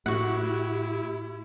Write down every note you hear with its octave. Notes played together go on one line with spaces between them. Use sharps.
A2 E4 F#4 G4 F#5